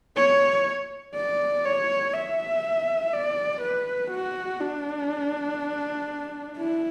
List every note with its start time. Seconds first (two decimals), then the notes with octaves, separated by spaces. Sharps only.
0.17 C#5
1.16 D5
1.65 C#5
2.14 E5
3.13 D5
3.62 B4
4.11 F#4
4.60 D4
6.58 E4